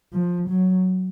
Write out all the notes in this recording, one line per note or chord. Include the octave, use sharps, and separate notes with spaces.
F3
F#3